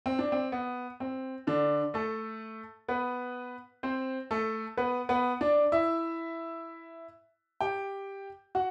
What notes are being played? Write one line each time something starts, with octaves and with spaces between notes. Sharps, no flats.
C4
D4
C4
B3
C4
D3 D4
A3 A4
B3 B4
C4 C5
A3 A4
B3 B4
B3 B4
D4 D5
E4 E5
G4 G5
F#4 F#5